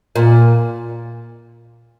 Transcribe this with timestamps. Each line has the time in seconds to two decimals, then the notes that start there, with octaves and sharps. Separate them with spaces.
0.16 A#2